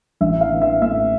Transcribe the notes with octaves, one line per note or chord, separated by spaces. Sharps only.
A1 E5
F5
E3
E5
A2 E5